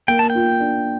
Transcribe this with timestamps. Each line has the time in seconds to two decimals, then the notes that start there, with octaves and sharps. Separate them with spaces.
0.08 A#3 G5
0.19 A5
0.30 G5
0.35 F4
0.60 D4